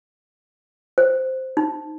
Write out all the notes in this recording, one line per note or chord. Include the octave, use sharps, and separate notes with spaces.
C5
D#4